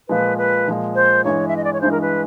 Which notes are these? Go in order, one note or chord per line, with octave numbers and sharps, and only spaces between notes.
A#2 F3 G#3 B4
B4
A#2 F3 G#3
C5
G2 E3 G#3 C#5
E5
D#5
D5
C#5
G2 E3 G#3 C5
A#4
B4